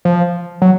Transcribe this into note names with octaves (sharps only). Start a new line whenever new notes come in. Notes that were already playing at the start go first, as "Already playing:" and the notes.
F3
F#3